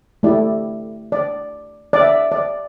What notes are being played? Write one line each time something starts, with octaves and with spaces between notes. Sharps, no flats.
A3 E4 G4 D5
D5
D5
E5
D5